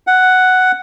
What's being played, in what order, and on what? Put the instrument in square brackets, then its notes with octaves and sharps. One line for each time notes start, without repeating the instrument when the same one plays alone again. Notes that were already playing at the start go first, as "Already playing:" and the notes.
[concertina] F#5